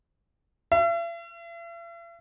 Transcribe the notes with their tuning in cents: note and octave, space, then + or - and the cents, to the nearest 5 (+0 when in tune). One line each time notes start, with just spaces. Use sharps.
E5 +45